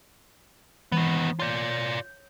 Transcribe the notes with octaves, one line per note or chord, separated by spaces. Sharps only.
D#3 E3 B3
F4 C#5 D5 G6